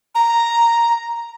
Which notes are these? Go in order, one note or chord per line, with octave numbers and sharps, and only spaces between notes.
A#5